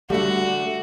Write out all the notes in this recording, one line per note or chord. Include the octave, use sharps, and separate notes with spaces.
D3 G3 A3 F#4 F#5 E6